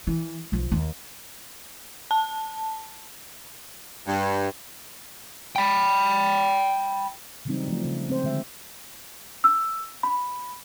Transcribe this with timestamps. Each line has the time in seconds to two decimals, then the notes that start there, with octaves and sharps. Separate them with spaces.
0.07 E3
0.52 B1 F3
0.72 D#2
2.11 A5
4.08 G2
5.56 G5 B5
7.45 C#3 E3 F#3 G3 C4 D#4
7.68 F3 A3
7.85 C#3
8.08 G#3 C4 C5
8.24 D3 D#3 G#3 E5
9.44 E6
10.03 B5